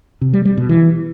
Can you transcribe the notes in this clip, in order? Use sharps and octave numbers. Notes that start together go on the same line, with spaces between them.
C3
G3
G3
B2
E3